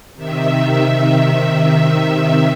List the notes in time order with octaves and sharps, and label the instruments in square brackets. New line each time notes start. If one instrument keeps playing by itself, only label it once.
[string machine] C3 D#3 E5